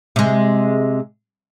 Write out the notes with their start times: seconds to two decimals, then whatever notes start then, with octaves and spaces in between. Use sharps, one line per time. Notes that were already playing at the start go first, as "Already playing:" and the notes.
0.16 C3 G#3